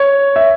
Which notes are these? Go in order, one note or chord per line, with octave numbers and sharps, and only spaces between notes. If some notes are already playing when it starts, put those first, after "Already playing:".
Already playing: C#5
E5